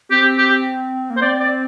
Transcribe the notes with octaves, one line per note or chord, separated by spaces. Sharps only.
C4 G4
G4
A#3
C5
C4 D5
D5